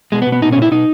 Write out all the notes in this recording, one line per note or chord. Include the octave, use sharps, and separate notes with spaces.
B2 G#3
B3
B2
B3
A#2 D#4
C#4
A#2 E4
B2 D#4